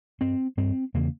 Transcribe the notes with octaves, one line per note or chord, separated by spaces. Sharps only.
G2 C4
G2 C4
E2 C#3 A#3